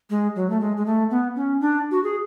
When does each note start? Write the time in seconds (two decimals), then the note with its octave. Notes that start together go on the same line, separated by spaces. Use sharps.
0.10 G#3
0.36 F#3
0.50 A3
0.61 G#3
0.77 G#3
0.86 A3
1.10 B3
1.36 C#4
1.61 D4
1.91 F#4
2.04 G#4